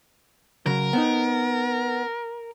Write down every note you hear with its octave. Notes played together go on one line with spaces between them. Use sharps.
C#3 F#3 A#4
B3 C4 D#4